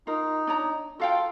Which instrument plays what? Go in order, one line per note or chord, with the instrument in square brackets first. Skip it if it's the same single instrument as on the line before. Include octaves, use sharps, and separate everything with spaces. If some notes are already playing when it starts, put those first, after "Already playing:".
[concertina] D#4 [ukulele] F4 A#4
[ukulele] D4 C#5 A#5
[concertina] F4 A4 [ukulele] F#4 F5 G5